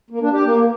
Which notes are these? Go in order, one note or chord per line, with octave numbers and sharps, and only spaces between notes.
A#3
D4
G4
A#3